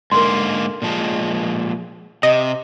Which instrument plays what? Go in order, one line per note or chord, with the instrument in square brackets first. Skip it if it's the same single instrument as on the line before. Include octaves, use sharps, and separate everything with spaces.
[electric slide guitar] G#2 D3 A#3 [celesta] A#4 C6
[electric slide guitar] A#2 F3 G#3
[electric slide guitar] C3 [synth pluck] D#5